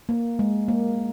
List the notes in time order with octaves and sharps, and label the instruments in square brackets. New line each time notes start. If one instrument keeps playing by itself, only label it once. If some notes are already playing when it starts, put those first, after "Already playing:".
[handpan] A#3
G#3
A#3